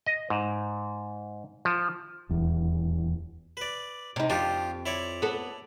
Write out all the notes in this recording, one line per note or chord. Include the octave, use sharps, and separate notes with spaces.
D#5
G#2
F3
D#1 E2
B4 D5
C3 D#4
F2 D4 F4 G4
E4 C#5 D5
B3 A4